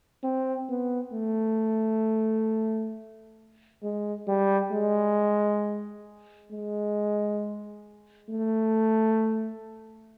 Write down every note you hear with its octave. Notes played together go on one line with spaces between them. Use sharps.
C4
B3
A3
G#3
G3
G#3
G#3
A3